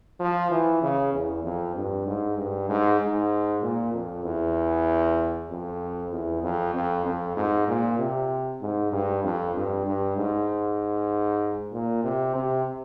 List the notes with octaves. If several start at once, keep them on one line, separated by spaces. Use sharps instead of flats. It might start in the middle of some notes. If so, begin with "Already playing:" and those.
F3
E3
C#3
E2
F2
G2
G#2
G2
G#2
G#2
A#2
F2
E2
F2
E2
F2
F2
F2
G#2
A#2
C3
G#2
G2
F2
G2
G2
G#2
A#2
C3
C3